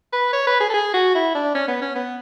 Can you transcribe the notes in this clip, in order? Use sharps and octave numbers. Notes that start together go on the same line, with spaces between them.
B4
C#5
B4
G#4
A4
G#4
F#4
E4
D4
C#4
B3
C#4
B3